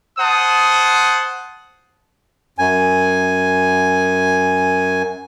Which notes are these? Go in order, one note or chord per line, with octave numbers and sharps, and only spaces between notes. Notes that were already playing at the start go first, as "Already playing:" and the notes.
C5 F#5 A5 D#6
F#2 G#5